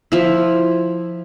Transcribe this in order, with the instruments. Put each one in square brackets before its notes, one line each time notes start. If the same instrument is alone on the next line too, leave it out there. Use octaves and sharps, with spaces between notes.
[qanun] F3 E4